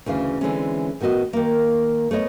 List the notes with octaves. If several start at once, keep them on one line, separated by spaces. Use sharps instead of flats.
D2 C#3 E3 F5
D3 E3 F#3 G#3 C4 C#4
A2 D#3 B3 F#4 D#5
D#3 A#3
A3 B3 C#5 D#5